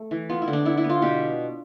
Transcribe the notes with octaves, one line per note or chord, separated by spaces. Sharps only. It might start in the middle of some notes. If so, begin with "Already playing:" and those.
Already playing: A3
E3
B3 F4
E4
D3
D4
B3 E4
E4
B3
F4
B2 G4